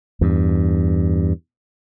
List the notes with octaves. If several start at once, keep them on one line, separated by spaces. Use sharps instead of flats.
E2 G2